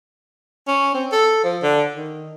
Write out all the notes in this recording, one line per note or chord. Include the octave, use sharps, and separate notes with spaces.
C#4
C4
A4
F3
D3
D#3